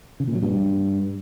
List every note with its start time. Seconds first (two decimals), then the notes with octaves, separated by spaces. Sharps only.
0.20 C#3
0.27 A#2
0.35 F#3
0.42 G2